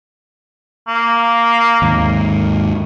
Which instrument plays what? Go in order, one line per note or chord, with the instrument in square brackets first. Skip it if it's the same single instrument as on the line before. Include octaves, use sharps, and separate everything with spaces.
[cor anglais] A#3
[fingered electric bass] D#2 G#2